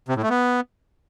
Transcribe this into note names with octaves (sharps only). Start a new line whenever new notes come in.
C3
A2
A3
B3